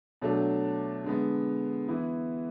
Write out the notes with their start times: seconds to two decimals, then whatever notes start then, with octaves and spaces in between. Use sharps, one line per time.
0.22 B2 F#3 A3 D4
1.04 D3 G#3 B3
1.88 E3 B3 E4